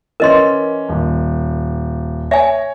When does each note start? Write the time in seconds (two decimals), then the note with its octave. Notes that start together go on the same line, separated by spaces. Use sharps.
0.20 E3 C#4 A#4 D#5 C6
0.89 D#1
2.31 C#5 E5 G#5